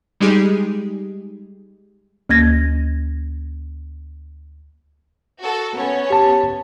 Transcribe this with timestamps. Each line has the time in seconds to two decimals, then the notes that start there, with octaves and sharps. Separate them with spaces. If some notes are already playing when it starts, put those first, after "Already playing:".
0.20 G3 G#3 D#4 G4 G#4
2.29 D2 A#3 G#6 A#6
5.41 F#4 A4
5.76 B3 C#4 C#5
6.10 G4 A5